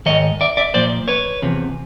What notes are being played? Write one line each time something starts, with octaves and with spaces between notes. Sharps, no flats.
G#2 D#3 C#5 D#5
D5 E5
D5 E5
A#2 F3 C5 D5
B4 C#5
E2 C3 F3